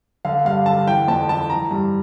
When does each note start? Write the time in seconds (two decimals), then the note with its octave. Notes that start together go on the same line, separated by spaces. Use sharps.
0.25 D3 F5
0.45 G2 F5
0.66 D3 A5
0.87 E3 G5
1.08 F2 A5
1.29 E3 A5
1.50 E3 A#5
1.71 G2